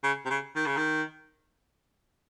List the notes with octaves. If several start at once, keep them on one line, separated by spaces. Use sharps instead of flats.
C#3
C3
C#3
D#3
C#3
D#3